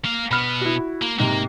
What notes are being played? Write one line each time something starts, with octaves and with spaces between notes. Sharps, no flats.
A#3 F5
B2 B3 B5 F6
E4 F#4
A#3
G#2 C3 A#3